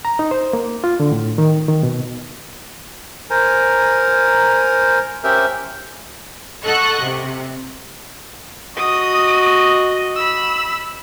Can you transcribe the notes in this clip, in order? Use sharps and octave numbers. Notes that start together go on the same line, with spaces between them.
A#5
D#4
C5
A#3
F4
D3
A2
D#3
D#3
B2
A#4 C5 G#5 A#5
C#4 G4 A#4 C5 E5
A4 D#5 F#5 C#6 F#6
C3
F#4 D#5 D#6
B5 E6